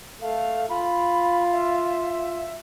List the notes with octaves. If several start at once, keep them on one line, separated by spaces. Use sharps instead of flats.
A3 F5
F4 B5
E5